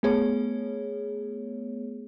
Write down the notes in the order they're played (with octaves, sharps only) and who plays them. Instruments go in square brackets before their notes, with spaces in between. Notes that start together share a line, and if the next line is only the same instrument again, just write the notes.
[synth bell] A3 B3 G#4 C#5